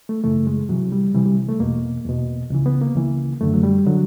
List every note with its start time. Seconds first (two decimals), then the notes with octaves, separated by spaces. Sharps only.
0.09 A3
0.24 F#2 C#3 E3 A3
0.47 G#3
0.69 C2 C3 E3 F#3
0.92 G3
1.14 C2 C3 E3 G3
1.26 G3
1.49 A3
1.60 E2 B2 A#3
2.05 E2 B2
2.50 C#2 C#3 E3
2.66 B3
2.81 A#3
2.96 C#2 C#3 E3
3.41 F#2 D3 A3
3.54 F#3
3.63 G3
3.86 D3 F#3